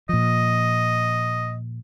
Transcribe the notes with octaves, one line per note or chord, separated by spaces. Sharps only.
A#2 F3 D#5